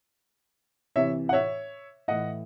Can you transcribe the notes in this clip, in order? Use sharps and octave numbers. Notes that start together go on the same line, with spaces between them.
C3 E3 C#5 E5
F#5
C#5 E5
A2 E3 D#5 F#5